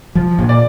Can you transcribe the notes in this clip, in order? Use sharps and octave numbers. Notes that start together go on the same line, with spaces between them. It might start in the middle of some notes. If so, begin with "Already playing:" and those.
F3
A#2
D5